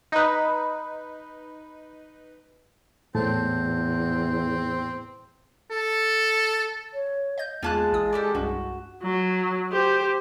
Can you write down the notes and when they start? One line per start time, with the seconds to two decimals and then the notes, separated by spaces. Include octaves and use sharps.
0.12 D#4 B4
3.15 E2 A2 C4 A5
5.70 A4
6.93 C#5
7.38 D#5 G6
7.63 E2 G#3 A#3 F4 A5 F#6 G#6
7.93 A1 E4 D#6
8.13 G4 A4 D5
8.35 C2 G2 C#4 F#4
9.03 F#3
9.72 G4 C5